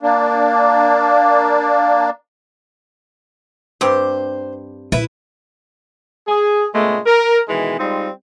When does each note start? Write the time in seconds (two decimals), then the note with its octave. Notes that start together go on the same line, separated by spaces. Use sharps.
0.03 A#3 D4
3.81 G2 C4 G4 C5
4.92 A#2 E4 B4 E5
6.28 G#4
6.75 A#2 C#3 G#3 A3 B3
7.06 A#4
7.48 B2 D#3 E3 G#3
7.79 G3 G#3 C4 D#4 F4